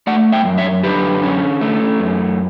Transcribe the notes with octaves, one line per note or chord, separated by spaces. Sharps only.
A3 D5 F#5
E5 G5
F#2
C#5 E5
D3 G4 B4
C#4
A3
F#2